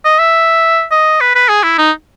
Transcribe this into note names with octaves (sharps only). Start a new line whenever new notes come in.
D#5
E5
D#5
B4
B4
G#4
E4
D#4